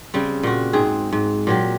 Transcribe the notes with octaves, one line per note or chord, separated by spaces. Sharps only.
C#3 G3 C4
A#2 F#4
G#2 C4 G#4
G#2
A#2 F#3 G4